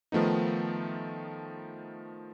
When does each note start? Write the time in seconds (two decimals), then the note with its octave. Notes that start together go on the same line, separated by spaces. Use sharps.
0.12 D#3 F3 A3 B3 D#4